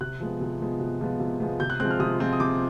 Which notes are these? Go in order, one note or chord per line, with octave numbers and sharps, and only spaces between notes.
C3 F#6
F3 G#3 B3
C3
F3 G#3 B3
C3
F3 G#3 B3
C3
F3 G#3 B3
C3 G6
F#6
F3 G#3 C4 F#6
F6
C3 D#6
F3 G#3 C4
D#6
C3 D6